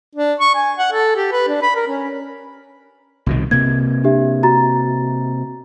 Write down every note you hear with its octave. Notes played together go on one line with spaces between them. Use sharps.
D4
C#6
G#5
F#5
A4
G4
B4
D4
B5
A#4
C#4
C2 B2 D#3
C3 A#3 G#6
D4 G4 E5
F#4 A#5 A6